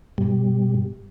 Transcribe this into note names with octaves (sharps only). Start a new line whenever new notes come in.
G2 B2 G3